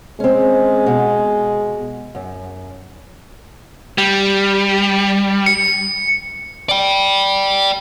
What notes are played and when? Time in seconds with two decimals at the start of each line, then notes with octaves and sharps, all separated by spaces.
0.20 G#3 C4 C#4
0.86 B2
2.15 F#2
3.98 G3
5.46 C#7
6.69 D5 G5